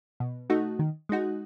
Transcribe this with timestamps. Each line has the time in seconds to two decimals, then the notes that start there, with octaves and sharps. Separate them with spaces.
0.20 B2
0.50 A3 D#4 F#4
0.79 D#3
1.09 G#3 D#4 F#4